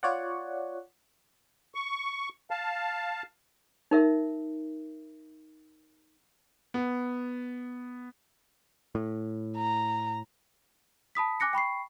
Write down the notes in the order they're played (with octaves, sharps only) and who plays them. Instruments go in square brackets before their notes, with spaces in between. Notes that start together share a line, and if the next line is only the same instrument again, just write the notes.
[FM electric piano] F4 C#5 D5 F#5
[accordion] C#6
F5 A5
[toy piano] D#4 A#4 E5
[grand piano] B3
[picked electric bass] A2
[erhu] A#5
[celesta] A5 B5 D#6 B6
G#5 D6 F#6 A#6 C#7
G5 B5 C#6 C7